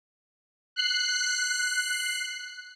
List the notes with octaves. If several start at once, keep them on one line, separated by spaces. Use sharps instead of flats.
F#6 C7